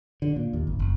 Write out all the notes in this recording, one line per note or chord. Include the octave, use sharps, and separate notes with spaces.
D3
A#2
D#2
G#1
F#1